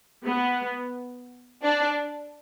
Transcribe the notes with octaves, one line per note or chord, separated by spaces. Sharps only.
B3
D4